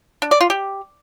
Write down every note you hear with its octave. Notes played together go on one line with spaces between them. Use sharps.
D4
D5
F4
G4